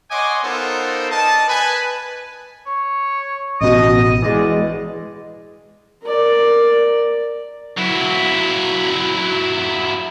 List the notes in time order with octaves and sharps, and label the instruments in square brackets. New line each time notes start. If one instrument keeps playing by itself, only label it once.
[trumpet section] C#5 D#5 F#5 G#5 C6 D6
B3 D#4 F4 A4 A#4 C5
A#4 D5 D#5 A5
B4 G#5
[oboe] C#5
[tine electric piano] A1 B2 [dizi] D#5 [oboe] D#6
[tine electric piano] E3 G#3 [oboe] D5
[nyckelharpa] A#4 D5
[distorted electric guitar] F#3 E4